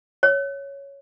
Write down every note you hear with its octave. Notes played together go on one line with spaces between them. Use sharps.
C#5